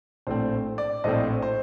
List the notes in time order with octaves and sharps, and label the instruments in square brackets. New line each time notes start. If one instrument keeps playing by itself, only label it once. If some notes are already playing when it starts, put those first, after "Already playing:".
[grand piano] A#1 A2 A3 C4 C5
D5
A#1 A2 A3 C4 C5 D#5
C5